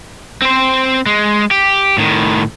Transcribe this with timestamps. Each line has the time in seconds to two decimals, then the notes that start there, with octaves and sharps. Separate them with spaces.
0.42 C4 C5
1.06 G#3
1.51 G4
1.98 A2 D#3